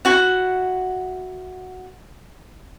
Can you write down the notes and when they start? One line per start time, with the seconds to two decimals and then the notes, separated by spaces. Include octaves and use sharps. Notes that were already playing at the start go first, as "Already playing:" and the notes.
0.05 E4 F#4 F#5